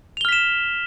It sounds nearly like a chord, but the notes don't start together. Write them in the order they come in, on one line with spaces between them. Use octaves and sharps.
F7 G7 F6 B6 E7